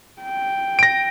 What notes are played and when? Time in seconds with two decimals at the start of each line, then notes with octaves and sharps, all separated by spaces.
0.22 G5
0.79 A#6 D7